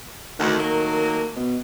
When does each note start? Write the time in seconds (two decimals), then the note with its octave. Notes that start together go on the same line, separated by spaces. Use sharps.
0.39 D2 D#3
0.58 F#3 A3 A#3
1.36 B2